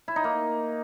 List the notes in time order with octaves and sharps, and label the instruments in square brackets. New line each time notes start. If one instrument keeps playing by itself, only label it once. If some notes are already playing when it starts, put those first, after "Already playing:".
[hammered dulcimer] E4
D#4
A#3